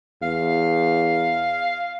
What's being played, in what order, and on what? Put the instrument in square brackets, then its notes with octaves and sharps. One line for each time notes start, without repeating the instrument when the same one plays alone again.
[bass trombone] E2 [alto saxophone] F5